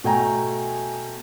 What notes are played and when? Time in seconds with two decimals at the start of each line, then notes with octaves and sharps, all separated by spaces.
0.04 B2 A3 G5 G#5 A#5